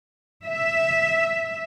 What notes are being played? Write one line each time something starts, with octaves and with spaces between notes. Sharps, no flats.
E5